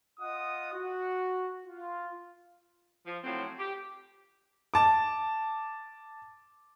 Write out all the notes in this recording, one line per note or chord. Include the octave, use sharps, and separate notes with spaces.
F4 D#5 F#5 D#6
F#4
F4
F3
A2 F3 F#3 C4
G4
A5 D6